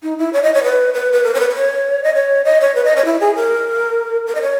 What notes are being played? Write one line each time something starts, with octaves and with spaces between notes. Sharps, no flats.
D#4
E4
C#5
D#5
C#5
B4
B4
B4
A#4
C#5
B4
B4
C#5
D#5
C#5
D#5
C#5
B4
D#5
C#5
E4
G#4
A#4
A#4
D#5
C#5